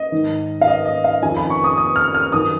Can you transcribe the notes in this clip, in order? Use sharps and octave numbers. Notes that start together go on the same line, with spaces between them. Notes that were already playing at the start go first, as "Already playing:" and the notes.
Already playing: D#5
G#2 D#3
F5
D#5
D#5
F5
F2 D#3 G#5
B5
C#6
D#6
D#6
F6
F6
F#2 D#3 D#6